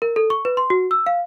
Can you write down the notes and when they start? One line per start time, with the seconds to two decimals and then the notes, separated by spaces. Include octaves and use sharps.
0.02 A#4
0.16 A4
0.30 C#6
0.45 B4
0.57 C6
0.70 F#4
0.91 E6
1.06 F5